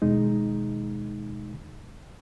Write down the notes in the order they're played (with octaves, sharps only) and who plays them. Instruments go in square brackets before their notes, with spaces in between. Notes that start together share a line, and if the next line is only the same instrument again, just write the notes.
[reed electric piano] D#2 B2 G#3 D#4